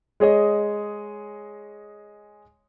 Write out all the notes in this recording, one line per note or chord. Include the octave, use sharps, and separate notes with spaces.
G#3 G#4 C#5 D#5